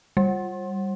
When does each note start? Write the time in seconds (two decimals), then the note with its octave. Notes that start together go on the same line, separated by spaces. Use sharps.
0.17 G3